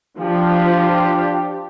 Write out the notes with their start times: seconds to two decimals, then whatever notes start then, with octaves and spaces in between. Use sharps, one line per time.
0.19 F3 D4 F4 G4